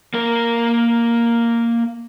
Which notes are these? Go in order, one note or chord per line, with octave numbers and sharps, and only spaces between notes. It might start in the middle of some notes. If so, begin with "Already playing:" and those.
A#3 A#4